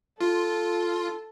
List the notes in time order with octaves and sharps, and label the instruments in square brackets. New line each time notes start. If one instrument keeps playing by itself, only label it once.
[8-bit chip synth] F4 [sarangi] A4